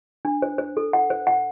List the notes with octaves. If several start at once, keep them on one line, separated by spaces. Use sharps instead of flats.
D4
C5
C5
A4
F#5
C5
F#5